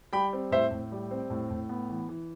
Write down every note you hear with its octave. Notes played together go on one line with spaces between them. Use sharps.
G3 G5 B5
C4
A2 C5 E5
A2
G3
C4
A2
A2
B3
E3
E3